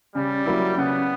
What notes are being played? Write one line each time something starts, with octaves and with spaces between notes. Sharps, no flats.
C#3 G3
F#3 A#3 E4
C#3 B3